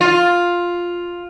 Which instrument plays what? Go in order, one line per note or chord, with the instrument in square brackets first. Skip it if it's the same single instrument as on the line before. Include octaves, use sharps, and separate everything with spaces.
[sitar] F4